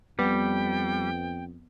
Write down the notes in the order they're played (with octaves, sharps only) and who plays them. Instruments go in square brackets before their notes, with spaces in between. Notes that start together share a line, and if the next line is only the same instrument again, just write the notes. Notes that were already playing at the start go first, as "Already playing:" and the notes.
[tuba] F2 [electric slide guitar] G3 [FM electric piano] B3 [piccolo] G5